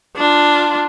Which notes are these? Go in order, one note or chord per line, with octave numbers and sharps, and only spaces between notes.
D4 F4